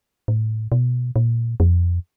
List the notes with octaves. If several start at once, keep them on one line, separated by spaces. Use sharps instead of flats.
A2
B2
A#2
F2